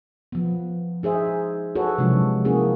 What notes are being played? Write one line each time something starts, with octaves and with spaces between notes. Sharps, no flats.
F3 B3
D#4 G#4 C5 E5
F#4 G#4 A4 B4 C#5
C3 F3 F#3 G#3 D4
A#3 C#4 E4 F#4 G#4